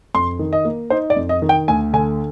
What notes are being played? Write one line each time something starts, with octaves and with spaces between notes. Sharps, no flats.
F2 C6
D#3
D#5
A#3
D#4 C5
D5
F2
D#5
D#3
G5
D2 G#5
D3 G#5